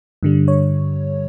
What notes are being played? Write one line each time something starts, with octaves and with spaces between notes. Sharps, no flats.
G2 D3 G3
C#5